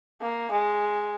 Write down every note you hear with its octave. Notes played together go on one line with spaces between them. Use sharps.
A#3
G#3